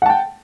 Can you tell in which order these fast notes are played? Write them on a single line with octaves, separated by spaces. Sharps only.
F#5 A5 G5